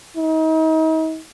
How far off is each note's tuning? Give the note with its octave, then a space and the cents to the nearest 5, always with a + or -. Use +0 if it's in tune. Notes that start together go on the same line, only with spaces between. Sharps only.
D#4 +40